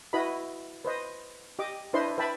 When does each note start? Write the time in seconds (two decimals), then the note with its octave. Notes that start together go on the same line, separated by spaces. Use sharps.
0.13 E4 F#4 B4 D#5 B5
0.85 B4 C5 D#5
1.59 G4 D#5 D6
1.93 D4 E4 B4 C5 D#5 C6
2.18 B4 E5 G5 A5 B5